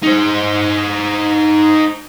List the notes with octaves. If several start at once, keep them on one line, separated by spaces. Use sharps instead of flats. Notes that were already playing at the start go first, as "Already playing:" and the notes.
D#4 C5